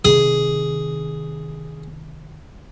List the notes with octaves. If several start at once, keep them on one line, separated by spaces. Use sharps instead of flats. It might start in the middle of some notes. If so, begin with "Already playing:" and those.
C3 D#3 G#4